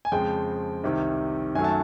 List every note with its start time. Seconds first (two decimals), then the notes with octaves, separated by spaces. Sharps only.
0.05 G#5
0.12 F2 C#3 F3 G#3 G5
0.84 C2 C3 D#3
1.55 F#2 D#3 F#3 A3 G#5
1.64 A5